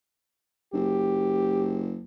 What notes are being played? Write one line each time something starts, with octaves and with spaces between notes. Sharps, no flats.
F#1 G4